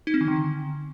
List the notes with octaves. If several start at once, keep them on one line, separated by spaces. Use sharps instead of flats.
D#4
C4
D#3
D3